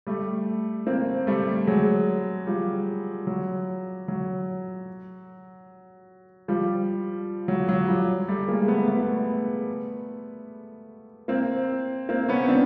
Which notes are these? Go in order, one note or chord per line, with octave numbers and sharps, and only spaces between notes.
G3 A3
A#3 C4
G3 A3
F#3 G#3
F3 G3
F#3
F#3
F3 G3
F#3
F#3
F3 G3
G3 A3
G#3 A#3
A3 B3
A3 B3
A#3 C4
A#3 C4
B3 C#4
C4 D4